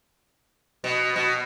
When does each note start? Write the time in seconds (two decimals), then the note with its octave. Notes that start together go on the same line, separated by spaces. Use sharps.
0.84 B2
1.16 B2